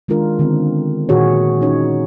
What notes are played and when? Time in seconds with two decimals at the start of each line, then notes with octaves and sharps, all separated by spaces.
0.08 D#3 G#3 D4 F4 A#4
0.39 D3 D#3 B3 C4
1.09 A#2 D#3 F#4 G#4 C#5
1.61 C#4 D#4 C#5